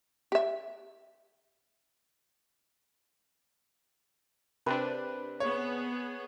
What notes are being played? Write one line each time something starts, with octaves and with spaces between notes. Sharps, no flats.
G4 E5
C3 C4 D4 B4
B3 G#4 C#5